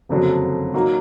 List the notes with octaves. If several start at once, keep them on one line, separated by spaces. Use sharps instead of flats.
F#1 F2 D3 F#3 D4
A#2 F#3 A#3 D#4 F#4